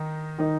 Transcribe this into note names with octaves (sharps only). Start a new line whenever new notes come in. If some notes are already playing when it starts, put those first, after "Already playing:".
Already playing: D#3 D#4
D#3 D#4